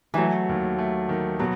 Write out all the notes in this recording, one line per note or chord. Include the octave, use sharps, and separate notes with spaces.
E3 F#3 A3
D#2
A3
D#3
B2 F#3